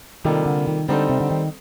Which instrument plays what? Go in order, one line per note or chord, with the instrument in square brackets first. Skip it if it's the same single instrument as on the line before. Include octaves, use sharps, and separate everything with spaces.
[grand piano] C3 G3 A#3 F4 A4 [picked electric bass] D#3
[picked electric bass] D3
D#3
[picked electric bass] D3 [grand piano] G3 C4 D#4 A4 C5
[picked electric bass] C3
D3
D#3